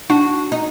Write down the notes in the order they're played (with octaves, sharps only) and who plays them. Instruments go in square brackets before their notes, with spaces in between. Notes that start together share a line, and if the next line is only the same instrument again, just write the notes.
[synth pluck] D4 [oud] F#4
[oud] D#4